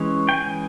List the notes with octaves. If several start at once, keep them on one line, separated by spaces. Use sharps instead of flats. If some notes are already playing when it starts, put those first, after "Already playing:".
Already playing: E3 G#3 C#4
G5
G#5